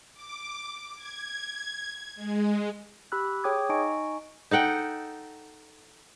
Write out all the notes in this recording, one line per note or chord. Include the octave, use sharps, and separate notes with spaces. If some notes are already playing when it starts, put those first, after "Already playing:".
D6
G#6
G#3
G4 B5 E6 F#6
G#4 C#5 G5 D6 D#6 G#6
D#4 D#5 G#5 C#6 D7
D#4 A4 F#5 G5